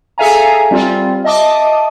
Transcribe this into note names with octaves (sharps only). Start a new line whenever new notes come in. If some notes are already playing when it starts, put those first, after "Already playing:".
G#4 A4 E5 F5 G#5 A#5
G3 C4 F4
D#5 E5 A5 D6 D#6